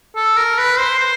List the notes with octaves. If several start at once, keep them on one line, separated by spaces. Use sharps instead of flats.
A4
A#4
B4
C5
C5